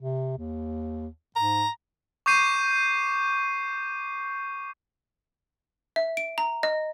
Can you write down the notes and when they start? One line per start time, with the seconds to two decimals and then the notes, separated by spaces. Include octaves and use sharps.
0.02 C3
0.38 D#2
1.36 G#2 A#5
2.26 C#6 D6 G6 C7 D#7
5.96 E5
6.17 D7
6.38 A#5
6.63 D#5